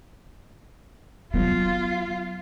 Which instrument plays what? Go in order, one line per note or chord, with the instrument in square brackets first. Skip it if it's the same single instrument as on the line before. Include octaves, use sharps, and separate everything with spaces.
[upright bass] F#3 B3 [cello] F4